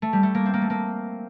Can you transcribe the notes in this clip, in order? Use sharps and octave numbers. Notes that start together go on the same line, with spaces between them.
A3
G3
A3
A#3
C4
A#3
A3
A#3